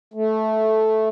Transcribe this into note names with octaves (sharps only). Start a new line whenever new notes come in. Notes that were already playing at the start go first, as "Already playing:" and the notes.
A3